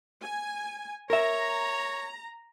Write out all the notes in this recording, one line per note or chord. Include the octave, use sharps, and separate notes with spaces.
G#5
A#4 C#5 E5 A#5